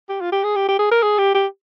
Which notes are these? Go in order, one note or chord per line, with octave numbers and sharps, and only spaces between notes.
G4
F4
G4
G#4
G4
G4
G#4
A#4
G#4
G4
G4